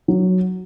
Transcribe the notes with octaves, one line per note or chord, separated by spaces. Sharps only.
F#3